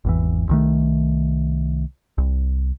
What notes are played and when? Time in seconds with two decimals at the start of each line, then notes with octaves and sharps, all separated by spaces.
0.05 G#1 E2 E3
0.49 C2 D#3 A3
2.18 C2